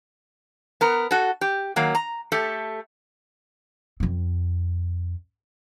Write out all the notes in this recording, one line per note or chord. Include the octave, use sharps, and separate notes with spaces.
B3 A#4
F#4 A4
G4
D#3 F#3 A#3
A#5
A3 G4 A4
F2 C4